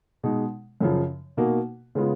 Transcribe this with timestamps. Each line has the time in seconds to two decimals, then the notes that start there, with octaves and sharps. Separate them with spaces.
0.23 B2 G#3 D#4
0.81 F#2 C#3 F3
1.37 B2 A#3 D#4 F#4
1.95 C#3 G#3 B3 F4